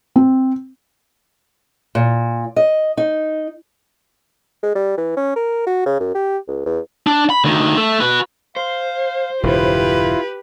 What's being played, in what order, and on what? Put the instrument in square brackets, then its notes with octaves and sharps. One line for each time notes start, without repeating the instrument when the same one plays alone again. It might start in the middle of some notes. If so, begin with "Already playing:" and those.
[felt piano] C4
[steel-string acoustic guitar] A#2
D#5
D#4
[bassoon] G#3
G3
E3
C#4
A#4
F#4
C#3
F#2
G4
C#2
E2
[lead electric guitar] D4
B5
D2 D#3
A3
F#4 B4
[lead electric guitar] C5 [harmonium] F5
[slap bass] E1 G2 C#3 [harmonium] E4 F4 [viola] G4 B4